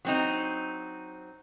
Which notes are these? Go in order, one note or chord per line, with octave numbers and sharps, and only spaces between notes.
F#3 C4 D#4